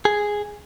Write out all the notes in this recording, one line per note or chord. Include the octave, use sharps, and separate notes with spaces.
G#4